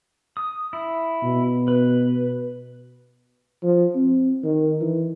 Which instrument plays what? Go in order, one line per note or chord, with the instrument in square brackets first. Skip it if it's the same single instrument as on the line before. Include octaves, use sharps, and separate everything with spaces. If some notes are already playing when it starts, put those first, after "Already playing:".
[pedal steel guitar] D#6
E4
[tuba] B2
[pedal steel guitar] B4
[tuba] F3
C4
D#3
E3